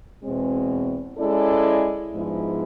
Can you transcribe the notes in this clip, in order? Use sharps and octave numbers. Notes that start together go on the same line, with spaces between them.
E2 B2 G#3 C4
G#3 C#4 E4 A4 D5
G#2 F3 G#3 B3 E4